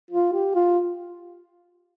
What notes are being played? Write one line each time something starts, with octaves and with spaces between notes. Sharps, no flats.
F4
G4
F4